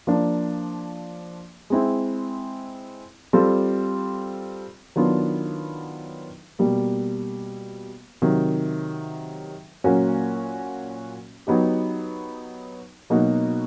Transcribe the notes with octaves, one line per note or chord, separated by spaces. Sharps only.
F3 A#3 D4
G#3 C4 E4
G3 C4 F4 A4
D#3 F#3 B3 D4 F4
B2 G3 A#3
C3 D#3 F#3
A#2 F#3 A#3 C#4 F#4
F#3 B3 D#4 G4
B2 F#3 A#3 D#4 F#4